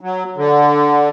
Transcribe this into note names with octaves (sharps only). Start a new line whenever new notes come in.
F#3
D3